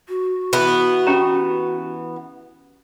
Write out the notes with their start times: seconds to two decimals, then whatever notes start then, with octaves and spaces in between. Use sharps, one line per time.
0.09 F#4
0.53 E3 B3
1.07 C#4 G4 A#5